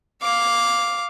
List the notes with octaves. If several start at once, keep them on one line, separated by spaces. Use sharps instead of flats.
F5 D6